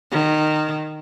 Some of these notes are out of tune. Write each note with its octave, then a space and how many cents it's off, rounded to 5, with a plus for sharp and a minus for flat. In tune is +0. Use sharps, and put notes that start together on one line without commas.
D#3 -20